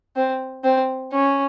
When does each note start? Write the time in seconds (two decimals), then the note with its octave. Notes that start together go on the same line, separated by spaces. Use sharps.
0.16 C4
0.64 C4
1.13 C#4